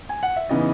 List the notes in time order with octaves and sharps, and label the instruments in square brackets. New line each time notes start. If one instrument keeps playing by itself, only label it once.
[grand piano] G#5
F#5
E5
C#3 E3 B3 D#4 D#5